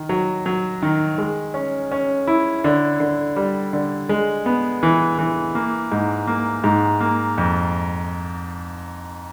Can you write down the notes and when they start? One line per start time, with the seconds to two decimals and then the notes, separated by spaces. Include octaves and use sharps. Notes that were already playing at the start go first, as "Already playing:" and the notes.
Already playing: D#3
0.09 F#3
0.46 F#3
0.82 D#3
1.18 G#3
1.54 C#4
1.92 C#4
2.27 E4
2.64 D3
3.00 D3
3.36 G3
3.73 D3
4.09 G#3
4.46 B3
4.83 E3
5.18 E3
5.55 A#3
5.92 G#2
6.27 A#3
6.64 G#2
7.01 A#3
7.38 F2